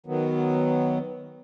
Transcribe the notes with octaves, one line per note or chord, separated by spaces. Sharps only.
D#3 F#3 B3